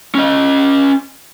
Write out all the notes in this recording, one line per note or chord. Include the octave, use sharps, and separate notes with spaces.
C#4 D#5